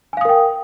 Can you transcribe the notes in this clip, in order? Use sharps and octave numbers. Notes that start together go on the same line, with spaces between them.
A#4 F5 G5 G#5 D#6